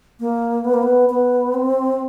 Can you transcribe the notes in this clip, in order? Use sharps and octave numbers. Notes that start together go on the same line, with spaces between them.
A#3
B3
A#3
B3
B3
C4